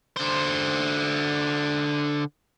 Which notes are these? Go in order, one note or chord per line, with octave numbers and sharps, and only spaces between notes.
D3 C5